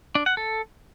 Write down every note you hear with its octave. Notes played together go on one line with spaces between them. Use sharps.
D4
F#5
A4